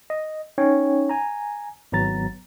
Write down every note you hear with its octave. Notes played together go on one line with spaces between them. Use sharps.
D#5
C#4 D#4 C#5 G5
G#5 A#5
G#1 F#3 B3 A#5 A6